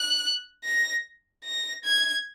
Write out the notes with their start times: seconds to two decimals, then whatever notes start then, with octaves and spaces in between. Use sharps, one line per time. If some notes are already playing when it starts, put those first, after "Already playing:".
Already playing: F#6
0.64 A#6
1.44 A#6
1.84 G#6